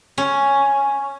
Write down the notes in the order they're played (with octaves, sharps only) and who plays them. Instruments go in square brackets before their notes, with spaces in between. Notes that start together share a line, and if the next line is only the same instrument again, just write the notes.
[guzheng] C#4